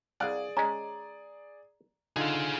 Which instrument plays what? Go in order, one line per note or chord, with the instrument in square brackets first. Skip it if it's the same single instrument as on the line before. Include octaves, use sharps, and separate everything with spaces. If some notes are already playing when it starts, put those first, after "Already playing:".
[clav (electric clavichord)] C2 F5 F#5 [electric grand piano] G#4 D5
[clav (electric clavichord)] G#3 C#4 [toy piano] A#5
[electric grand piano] D3 D#4 F4 [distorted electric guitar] G#4 F5